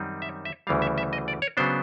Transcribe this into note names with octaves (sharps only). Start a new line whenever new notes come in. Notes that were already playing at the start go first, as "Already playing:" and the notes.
Already playing: F#2 D#3 G3 C4 D#4
E5
E5
D2 C#3 E3 G3 F5
E5
E5
D#5
D5
C#5
C#3 F#3 B3 D4 C5